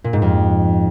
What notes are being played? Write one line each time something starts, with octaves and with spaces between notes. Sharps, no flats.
A#2
G#2
F2